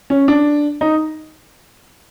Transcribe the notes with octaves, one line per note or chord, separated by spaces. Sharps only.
C#4
D4
D#4